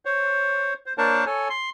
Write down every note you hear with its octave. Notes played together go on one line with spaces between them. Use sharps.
C5 C#5
C5
A#3 D4 A#4 C5 C#5 A5
A4 C#5 G#5
C6